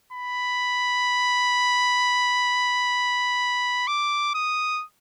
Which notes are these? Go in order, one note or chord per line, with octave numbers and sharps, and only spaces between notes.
B5
D6
D#6